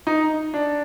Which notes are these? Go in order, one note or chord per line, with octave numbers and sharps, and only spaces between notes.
D#4
D4